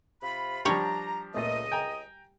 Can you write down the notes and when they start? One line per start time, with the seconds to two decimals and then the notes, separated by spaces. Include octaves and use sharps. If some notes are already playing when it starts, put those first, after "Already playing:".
0.22 C3 F4 B5
0.65 F3 G3 D4 G4 C#5 A#5
1.34 C#2 A#2 A3 D#5
1.72 G5 G#5 A#5